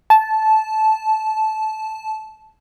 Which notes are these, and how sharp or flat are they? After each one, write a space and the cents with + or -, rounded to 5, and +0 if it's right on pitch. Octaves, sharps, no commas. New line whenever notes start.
A5 -15